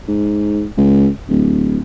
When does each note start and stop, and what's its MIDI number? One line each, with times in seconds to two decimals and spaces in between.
0.08 0.65 44
0.77 1.09 37
1.29 1.79 26